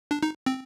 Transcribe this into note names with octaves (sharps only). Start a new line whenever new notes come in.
D4
D#4
C4